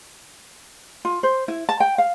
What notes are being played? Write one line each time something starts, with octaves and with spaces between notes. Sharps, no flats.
F4
C5
E4
A5
G5
F5